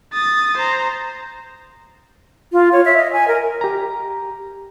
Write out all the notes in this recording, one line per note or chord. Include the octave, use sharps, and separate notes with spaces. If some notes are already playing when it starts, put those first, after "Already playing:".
D#6 A6
C5 A#5
F4
C#5
E5
D#5
G#5
A#4
G4 A#5